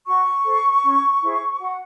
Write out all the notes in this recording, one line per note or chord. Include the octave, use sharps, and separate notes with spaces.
F#4 C#6
A4 C5
C#4
E4 G#4 C5
F#4 F#5